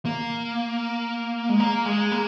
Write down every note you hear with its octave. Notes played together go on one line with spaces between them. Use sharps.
A#3
G#3
A#3
G#3
A#3